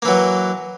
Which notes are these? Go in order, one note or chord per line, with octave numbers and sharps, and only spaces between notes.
E3 F#3 A#3